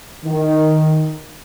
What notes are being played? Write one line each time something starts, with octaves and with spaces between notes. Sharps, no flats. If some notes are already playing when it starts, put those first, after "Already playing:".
D#3